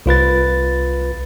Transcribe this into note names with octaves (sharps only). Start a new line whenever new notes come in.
C2 F4 B4 A6